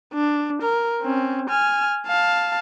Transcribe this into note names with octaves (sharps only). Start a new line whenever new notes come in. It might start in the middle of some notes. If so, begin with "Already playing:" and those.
D4
A#4
C4 C#4
G#5 F6
F5 A5